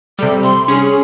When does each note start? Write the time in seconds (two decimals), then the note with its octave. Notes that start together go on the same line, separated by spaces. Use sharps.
0.19 C3 G3 A4
0.42 C6
0.68 C#4 G#4